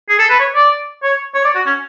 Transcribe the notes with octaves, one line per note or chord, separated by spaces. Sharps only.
G#4
A4
B4
C#5
D5
C#5
C#5
D5
F#4
C#4